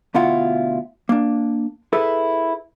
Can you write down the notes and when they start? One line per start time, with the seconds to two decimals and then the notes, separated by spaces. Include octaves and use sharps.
0.15 D2 B2 E4 F4 F#5
1.09 A#3 D4
1.93 E4 G#4 A4 B4